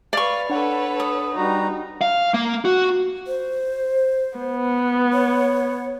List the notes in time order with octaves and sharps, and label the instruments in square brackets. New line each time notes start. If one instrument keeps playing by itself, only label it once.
[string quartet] B4 F5 [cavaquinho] D5 C#6
[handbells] D4 F#5 [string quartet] A4 B4 C#5
[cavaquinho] D#6
[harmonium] G3 F#4 A#5 [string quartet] D#4
[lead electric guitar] F5
A#3
F#4
[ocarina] C5
[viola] B3
[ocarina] C#5